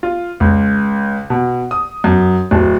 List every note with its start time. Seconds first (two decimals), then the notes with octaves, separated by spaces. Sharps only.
0.03 F4
0.40 C#2
1.30 B2
1.71 D#6
2.04 F#2
2.51 D1